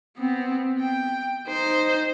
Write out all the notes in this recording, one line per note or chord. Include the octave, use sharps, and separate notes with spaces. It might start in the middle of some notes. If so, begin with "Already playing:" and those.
B3 C4
G5
D#4 C5